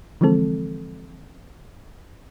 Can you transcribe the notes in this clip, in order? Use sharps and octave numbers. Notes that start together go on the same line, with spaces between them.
D3 E3 F3 G#3 C4 A4